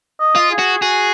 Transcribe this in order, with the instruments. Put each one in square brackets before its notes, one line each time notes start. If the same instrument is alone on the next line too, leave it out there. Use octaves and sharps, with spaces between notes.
[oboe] D#5
[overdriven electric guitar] F4
[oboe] G#4
[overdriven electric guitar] F#4
[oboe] F#4 [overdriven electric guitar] G#4